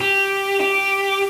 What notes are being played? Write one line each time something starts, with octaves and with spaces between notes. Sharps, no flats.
G4
G4